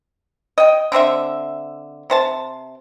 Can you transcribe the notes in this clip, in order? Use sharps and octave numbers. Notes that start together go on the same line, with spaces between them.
D#5 G5
D3 C4 C5 E5
C3 C5 A5